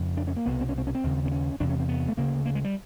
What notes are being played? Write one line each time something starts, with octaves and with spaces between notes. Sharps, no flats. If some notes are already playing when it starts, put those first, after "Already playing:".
Already playing: F2 C#3
D4
C#4
A#3
C2 B2 B3
C4
C#4
C4
C#4
C4
D#2 C#3
C4
C#4
E2 C3 D4
C#4
C4
B3
A3
D2 C#3 A#3
A#3
G#3
G3